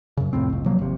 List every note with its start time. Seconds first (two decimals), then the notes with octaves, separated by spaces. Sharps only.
0.17 F#2 C#3
0.33 C2 F2 A2 C4
0.50 F#1 C#2
0.66 C3 F3 F#3 A#3
0.79 G#1 C3